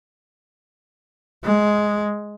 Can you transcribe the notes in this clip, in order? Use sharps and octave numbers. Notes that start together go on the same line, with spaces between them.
G#3